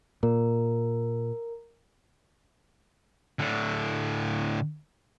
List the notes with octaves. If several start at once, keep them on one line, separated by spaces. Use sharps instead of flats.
A#2 A#4
A2 D3